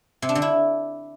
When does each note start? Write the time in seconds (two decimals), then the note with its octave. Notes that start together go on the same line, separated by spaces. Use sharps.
0.22 C3
0.29 D4
0.35 D3
0.42 E4